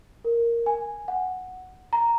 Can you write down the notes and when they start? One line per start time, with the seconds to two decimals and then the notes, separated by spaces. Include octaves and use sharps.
0.25 A#4
0.66 G#5
1.08 F#5
1.93 A#5